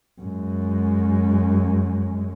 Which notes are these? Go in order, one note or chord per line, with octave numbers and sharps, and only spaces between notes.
F#2 G#3